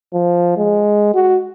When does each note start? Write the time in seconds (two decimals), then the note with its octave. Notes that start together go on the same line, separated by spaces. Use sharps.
0.13 F3
0.57 G#3
1.14 F#4